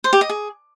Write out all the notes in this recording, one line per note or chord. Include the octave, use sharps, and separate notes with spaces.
C5
G4
D#5
G#4